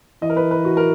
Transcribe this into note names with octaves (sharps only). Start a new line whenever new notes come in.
E3 D#5
A#4
B4
B4
F#4
A#4